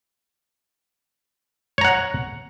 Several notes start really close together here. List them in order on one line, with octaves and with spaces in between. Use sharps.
C#5 A#5 F#5